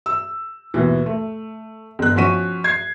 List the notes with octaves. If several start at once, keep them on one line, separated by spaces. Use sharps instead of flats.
E6
D#2 B2 E3
A3
G1 F#6
F3 C#4 F#4 B6 D#7
G#6 C7